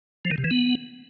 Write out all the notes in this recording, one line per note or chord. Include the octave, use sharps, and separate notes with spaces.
F3
D#3
C3
E3
B3